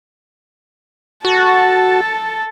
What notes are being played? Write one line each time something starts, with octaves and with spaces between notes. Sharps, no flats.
F#4 A4 A5